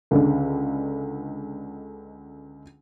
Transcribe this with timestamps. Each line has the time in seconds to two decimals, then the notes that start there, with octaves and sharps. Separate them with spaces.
0.11 C#2 D3 G#3